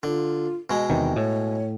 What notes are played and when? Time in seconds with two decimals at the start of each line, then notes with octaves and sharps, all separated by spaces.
0.03 D3 F4
0.70 B2 G#3
0.90 E2 C3 D#3 G5
1.16 A2 C#5